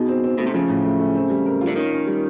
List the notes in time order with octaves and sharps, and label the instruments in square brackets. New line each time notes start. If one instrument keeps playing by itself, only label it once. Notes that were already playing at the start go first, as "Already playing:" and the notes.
Already playing: [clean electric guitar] B2 [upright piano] D#4 G#4
[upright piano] C4
C4
[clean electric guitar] B2 [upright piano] A3
[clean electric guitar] C3
[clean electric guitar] C#3 [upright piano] F3
[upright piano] A2
A3
A3
C4
G3
A#4
F4
[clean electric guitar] D3
[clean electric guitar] D#3 [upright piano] C#4
[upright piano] C#4
G3